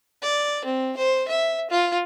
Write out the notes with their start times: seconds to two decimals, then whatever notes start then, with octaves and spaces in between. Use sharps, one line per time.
0.22 D5
0.65 C4
0.97 C5
1.28 E5
1.71 F4